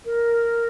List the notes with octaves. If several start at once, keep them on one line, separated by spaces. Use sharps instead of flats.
A#4